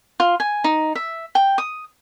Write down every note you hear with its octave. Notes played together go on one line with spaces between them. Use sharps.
F4
G#5
D#4
E5
G5
D#6